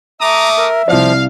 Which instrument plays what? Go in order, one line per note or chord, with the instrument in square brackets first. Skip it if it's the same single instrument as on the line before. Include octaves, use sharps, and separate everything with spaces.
[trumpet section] A3 D6 D#6 [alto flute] E5 [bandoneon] A#5
[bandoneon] A#4
[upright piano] C2 D5 [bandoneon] F3 [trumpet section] F5